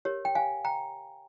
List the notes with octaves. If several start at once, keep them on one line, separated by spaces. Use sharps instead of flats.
G4 A#4 C#5
G5
F5 G#5
G5 A#5